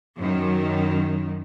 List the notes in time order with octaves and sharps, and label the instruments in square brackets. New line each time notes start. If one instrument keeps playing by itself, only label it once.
[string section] F#2 D#3